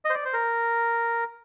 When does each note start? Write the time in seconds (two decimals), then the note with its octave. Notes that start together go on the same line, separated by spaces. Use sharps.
0.05 D#5
0.10 C5
0.14 D5
0.25 C5
0.33 A#4